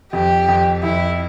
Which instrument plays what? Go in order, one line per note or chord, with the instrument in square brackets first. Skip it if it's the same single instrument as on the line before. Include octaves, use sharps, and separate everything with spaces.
[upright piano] F2 [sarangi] G4
[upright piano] F2
[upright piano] F2 [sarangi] E4